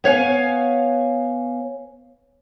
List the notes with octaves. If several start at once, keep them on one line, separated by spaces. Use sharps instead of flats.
B3 C#5 F5 G#5